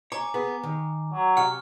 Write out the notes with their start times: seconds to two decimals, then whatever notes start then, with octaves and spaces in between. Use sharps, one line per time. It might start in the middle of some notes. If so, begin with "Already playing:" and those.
0.12 C#5 G#5 A#5 D6
0.34 B3 G#4 B5
0.63 D#3
1.12 F#3
1.37 C3 F#5 C#6 F6